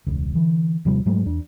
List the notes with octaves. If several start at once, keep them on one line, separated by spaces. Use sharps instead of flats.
E1 C#2
D3 E3
D#2 C3 F3 G3
G#2 F#3 G#3 A3
E2 D4